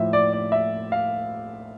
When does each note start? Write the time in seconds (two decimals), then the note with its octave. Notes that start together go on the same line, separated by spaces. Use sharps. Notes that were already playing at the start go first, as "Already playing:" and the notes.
Already playing: A2 F3 E5
0.13 D5
0.33 D5
0.52 E5
0.92 F5